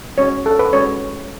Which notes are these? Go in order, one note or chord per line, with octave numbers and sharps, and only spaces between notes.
G#3 C#4 F#4 C#5
A4
B4
G#3 C#4 F#4 C#5